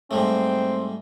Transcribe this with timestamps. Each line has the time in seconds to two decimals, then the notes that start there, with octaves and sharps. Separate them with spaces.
0.11 G#2 G3 A3 C4